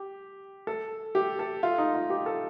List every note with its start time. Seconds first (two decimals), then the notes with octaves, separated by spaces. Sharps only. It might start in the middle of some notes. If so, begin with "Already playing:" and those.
Already playing: G4
0.67 A4
1.15 G4
1.39 A4
1.63 F4
1.78 D#4
1.94 F4
2.10 G4
2.26 A4